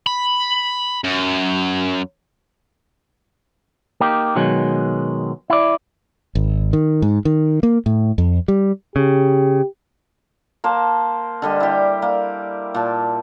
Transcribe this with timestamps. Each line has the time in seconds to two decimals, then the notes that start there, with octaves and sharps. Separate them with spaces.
0.07 B5
1.04 F#2
4.01 A#3 D#4 G4
4.36 B2 D#3 F#3 G#3
5.50 E4 D5
6.35 G#1
6.73 D#3
7.02 G#2
7.25 D#3
7.63 A#3
7.86 A2
8.18 F2
8.48 G3
8.96 C#3 G4
10.64 A#3 C5 A5
11.42 D3 G3 D#5
11.60 E4 G4
12.02 A#3
12.74 A#2 A5